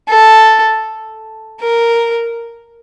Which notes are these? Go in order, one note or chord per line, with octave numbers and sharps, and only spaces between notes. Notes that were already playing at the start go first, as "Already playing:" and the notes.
A4
A#4